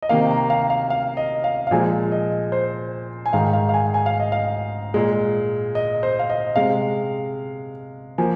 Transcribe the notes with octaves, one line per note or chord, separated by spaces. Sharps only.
D#5
C3 D#3 A#3 F5
A#5
F5
F5
F5
D#5
F5
F5
A#2 F3 G#3 G#5
D#5
C5
G#5
G#2 D#3 G#3 F5
F5
F5
G#5
G#5
F5
D#5
F5
A#2 G#3
D#5
C5
F5
D#5
C3 G#3 F5
F3 A#3 G#5